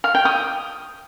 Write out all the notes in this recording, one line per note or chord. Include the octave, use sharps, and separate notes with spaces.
F5
G5
D#6